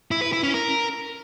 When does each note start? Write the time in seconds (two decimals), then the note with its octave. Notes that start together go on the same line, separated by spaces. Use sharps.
0.11 E4
0.22 B4
0.33 E4
0.43 C#4
0.54 A#4